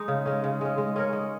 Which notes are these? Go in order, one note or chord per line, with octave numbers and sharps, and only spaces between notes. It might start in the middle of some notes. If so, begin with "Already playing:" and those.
Already playing: G#3 D#4
C#3
G#3 C#4
C#3
G#3 C#4
G#3
C#4 A#4 C#5
G#3